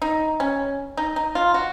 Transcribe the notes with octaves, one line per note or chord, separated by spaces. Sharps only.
D#4
C#4
D#4
D#4
F4
F#4